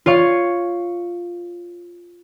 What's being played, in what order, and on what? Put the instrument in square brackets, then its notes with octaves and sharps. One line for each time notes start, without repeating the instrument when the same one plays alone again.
[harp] F4 C#5 F5 C#6